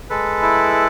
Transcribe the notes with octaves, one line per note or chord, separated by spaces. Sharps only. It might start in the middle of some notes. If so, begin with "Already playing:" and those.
G#3 A4 B4
E4